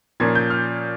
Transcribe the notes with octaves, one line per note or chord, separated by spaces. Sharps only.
A#2 F3 A#3 C#4 G#6
G6
F6